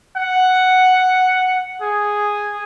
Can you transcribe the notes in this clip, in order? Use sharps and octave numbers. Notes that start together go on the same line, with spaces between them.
F#5
G#4